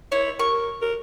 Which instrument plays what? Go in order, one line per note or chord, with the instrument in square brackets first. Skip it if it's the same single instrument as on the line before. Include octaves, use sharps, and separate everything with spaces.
[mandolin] E4 [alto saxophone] C#5
[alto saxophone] A#4 [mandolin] C#6
[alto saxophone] A#4